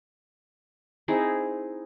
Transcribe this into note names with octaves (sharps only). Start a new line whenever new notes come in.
C4 D#4 E4 G#4